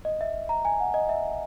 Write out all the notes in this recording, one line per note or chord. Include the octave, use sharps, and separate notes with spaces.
D#5
E5
A#5
G#5
F#5
D#5
E5